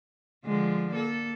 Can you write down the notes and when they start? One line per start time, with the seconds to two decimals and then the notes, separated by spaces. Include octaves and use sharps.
0.45 D3 F3 G#3
0.94 A#3 A4